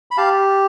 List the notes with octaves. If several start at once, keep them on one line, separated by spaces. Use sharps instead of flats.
B5
G4 F5 A5